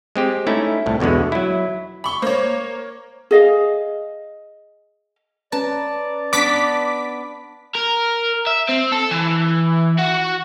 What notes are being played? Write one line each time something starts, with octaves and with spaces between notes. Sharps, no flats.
G#3 C4 G4
A3 C#4 D#4 E4 E5
C2 A2
E2 B2 D3 G#3 B3
F#3 E4
B5 C#6 F#7 G7
A#3 C5 C#5
G#4 D#5 F5
C#4 B4 D5 A5 A#5
B3 D4 D6 B6
A#4
E5
C4
A4
E3
F#4